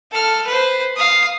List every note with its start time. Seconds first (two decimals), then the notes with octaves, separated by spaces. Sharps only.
0.11 A4 F6
0.46 B4 C5
0.96 F5 D#6